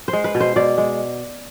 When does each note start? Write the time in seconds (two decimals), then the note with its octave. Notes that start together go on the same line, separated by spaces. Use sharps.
0.08 C5
0.13 G#3
0.24 B4
0.35 B2
0.40 C5
0.56 B2 D5
0.78 G#3